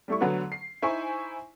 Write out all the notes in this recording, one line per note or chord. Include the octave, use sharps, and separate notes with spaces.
G3 A3 E4 C#6
D3 F#3 A3 B3 F#4 B4
C7
D#4 E4 C5 G#5 C#6